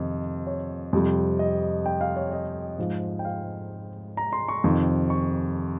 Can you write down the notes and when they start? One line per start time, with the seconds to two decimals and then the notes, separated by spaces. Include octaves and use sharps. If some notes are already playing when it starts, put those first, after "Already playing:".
Already playing: F2 C3 D#3 D#5
0.47 C#5
0.93 F2 C3 G3
1.39 D#5
1.86 G5
2.01 F5
2.16 C#5
2.32 D#5
2.78 G#2 F3
3.19 G5
3.25 F5
4.17 A#5
4.33 C6
4.48 C#6
4.64 F2 C3 D#3
5.10 C#6